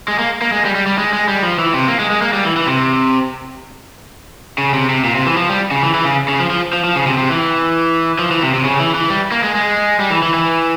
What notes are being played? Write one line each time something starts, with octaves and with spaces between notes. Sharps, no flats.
G#3
A#3
A#3
G#3
G3
G3
G3
G#3
G#3
G3
F3
E3
C3
A#3
G#3
G#3
A#3
G3
E3
E3
C3
C#3
C3
C3
A#2
C3
E3
F3
G3
C#3
E3
E3
C#3
C#3
F3
F3
F3
F3
C#3
C3
C3
E3
F3
E3
C3
C3
C#3
E3
E3
G3
A#3
G#3
G#3
G3
E3
E3
E3